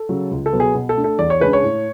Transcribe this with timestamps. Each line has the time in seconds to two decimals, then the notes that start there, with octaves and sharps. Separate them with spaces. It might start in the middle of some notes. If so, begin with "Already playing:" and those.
Already playing: A4
0.09 C#3 F#3
0.31 C#2
0.46 A4
0.53 B2 F#3 B3
0.60 G#4
0.75 B2
0.89 A4
0.96 A3 D4
1.04 A4
1.19 E2 D5
1.30 C#5
1.40 C#3 G#3 D4 B4
1.53 C#5
1.63 A2